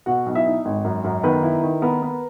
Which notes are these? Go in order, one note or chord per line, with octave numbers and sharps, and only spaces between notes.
B2 F#4 F#5
B1
E4 E5
D#4
G#1
F#2
F#2
D#3 B3 B4
E4
D#3
B3 A#4
B3